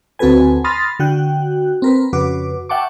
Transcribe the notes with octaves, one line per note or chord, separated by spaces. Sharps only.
D2 C4 F#4 A4 B4 G#5
B5 C6 D#6 F6 A6 A#6
D3 F#4 G5 F#6
C4 A#4 B4
F2 C#3 F#4 B4 D6
E5 F#5 G5 A5 C#6 D6